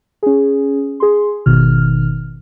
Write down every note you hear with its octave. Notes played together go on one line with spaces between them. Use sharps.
C#4 G#4
G#4 C6
G#1 B2 D#3 F6